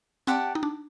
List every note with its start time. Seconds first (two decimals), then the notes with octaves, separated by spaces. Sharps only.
0.27 C4 G4 D5 F#5 A5
0.55 D#4
0.63 D4